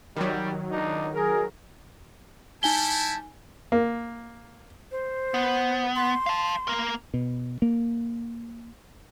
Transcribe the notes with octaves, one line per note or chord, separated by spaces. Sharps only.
D#3 F#3 G3
C#2 D4 D#4
G#4 A#4
G3 D#4 E4 G#5 A5 G7
A#3
C5
B3
C6
F5 A5
A#3 A#4
B2
A#3